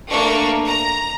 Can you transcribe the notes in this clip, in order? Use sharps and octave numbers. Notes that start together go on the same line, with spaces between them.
A3 A#3 D4 C#6
A#5